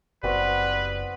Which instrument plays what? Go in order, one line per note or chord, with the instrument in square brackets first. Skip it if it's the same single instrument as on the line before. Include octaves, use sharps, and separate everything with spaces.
[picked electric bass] F#1 [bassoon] G3 [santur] B3 C4 F#4 [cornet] B4